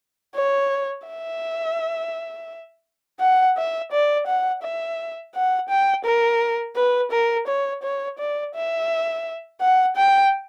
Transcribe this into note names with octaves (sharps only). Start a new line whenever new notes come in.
C#5
E5
F#5
E5
D5
F#5
E5
F#5
G5
A#4
B4
A#4
C#5
C#5
D5
E5
F#5
G5